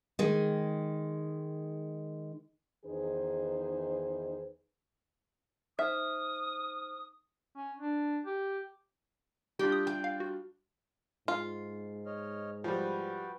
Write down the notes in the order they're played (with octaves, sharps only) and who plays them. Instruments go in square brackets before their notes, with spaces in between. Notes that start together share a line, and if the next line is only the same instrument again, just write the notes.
[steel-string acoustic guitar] D#3 G#3
[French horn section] E2 D#3 D#4 G#4 B4 C5
[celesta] D#4 C5 F6 [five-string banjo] E5 [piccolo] D#6
[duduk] C#4
D4
G4
[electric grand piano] G3 D4 F4 [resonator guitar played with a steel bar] G4
[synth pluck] D#6
[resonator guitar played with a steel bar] G5
[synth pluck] F5
F#4
[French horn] G#2 [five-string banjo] F4
[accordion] C#5 D#5 F6
[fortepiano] F3 G3 [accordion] F#4 B4 G5